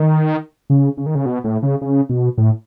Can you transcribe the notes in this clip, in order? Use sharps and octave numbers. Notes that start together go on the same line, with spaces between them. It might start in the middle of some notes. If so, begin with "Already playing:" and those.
Already playing: D#3
C#3
C#3
D#3
C#3
B2
A2
C#3
C#3
B2
A2